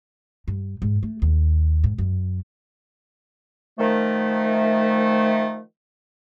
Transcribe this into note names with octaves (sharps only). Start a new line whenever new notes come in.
G2
G#2
A3
D#2
G#2
F#2
D#3 F3 A3